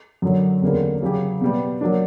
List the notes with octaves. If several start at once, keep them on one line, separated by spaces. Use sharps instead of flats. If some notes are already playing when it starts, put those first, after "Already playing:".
F#2 D3 F#3
E2 D3 G3 A#3 C#4
C#3 F#3 C#4 G4
B2 G3 B3
F#3 A#3 D4